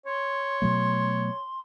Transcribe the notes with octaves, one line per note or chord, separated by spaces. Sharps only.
C#5 C6
B2 F#3 A3